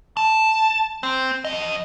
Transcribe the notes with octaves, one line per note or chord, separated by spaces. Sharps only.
A5
C4
F2 D#5